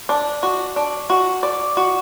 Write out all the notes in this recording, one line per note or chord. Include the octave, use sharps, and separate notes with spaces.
D4
F#4
D4
F#4
D5
F#4